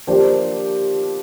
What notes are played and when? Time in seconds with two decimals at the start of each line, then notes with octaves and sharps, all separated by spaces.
0.07 F3 A#3 D4 G4 C5